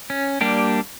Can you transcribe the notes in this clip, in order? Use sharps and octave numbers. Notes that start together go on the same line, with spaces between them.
C#4
G3 A#3 D4 G4